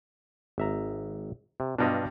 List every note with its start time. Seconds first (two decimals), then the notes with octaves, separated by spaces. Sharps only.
0.58 G#1 E5 A#5
1.60 C3
1.79 G2 B2 D4 F4 D#5